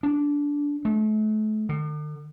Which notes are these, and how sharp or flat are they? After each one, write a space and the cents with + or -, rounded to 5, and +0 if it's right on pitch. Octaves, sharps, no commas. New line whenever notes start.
D4 -15
A3 -35
D3 +45